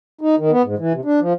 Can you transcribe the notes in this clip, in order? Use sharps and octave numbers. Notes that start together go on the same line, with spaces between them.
D#4
D#3
B3
G#2
E3
C3
D4
F3